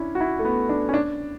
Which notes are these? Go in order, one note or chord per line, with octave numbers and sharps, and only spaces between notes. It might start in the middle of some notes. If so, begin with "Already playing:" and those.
Already playing: C#4 D4 E4
F#4
E4
A3
B3
D4
C#4
D4